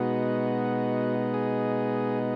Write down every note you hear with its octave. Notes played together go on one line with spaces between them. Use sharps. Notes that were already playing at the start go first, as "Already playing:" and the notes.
Already playing: B2 G#3 B3 D#4 F#4
G#4